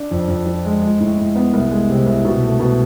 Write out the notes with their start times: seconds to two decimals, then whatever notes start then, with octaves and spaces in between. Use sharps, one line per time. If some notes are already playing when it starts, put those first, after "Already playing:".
Already playing: D4
0.11 F2
0.28 F2
0.46 F3
0.65 G#3
0.82 G#3
1.00 A2
1.18 A2
1.36 B3
1.53 C2
1.71 G#3
1.90 C3
2.06 C2
2.25 B2
2.43 A3
2.60 B2